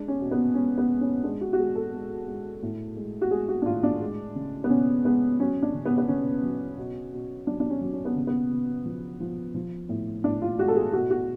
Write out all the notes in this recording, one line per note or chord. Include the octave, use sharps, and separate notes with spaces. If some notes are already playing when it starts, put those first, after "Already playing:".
Already playing: G#3 D4
C#4
B2
B3
G#3 C#4
B3
G#3
C#4
G#3 D4
F#4
F#4
G#3 G#4
A4
G#3
G#3
A2
G#3
F#4
G#3 G#4
F#4
D4
A2 F4
D4
G#3
C#3
B3
C#3 C#4
G#3 B3
F#3 C#4
D4
C#3
B3
B3
C#3 C#4
F#3
B2
B2
F#3 D4
D4
C#4
F#3
C#4
B3
C#3
B3
C#3
F3
F3
F3
A2
A2 D4
F4
G#3 F#4
A4
G#4
B2 F#4
F#4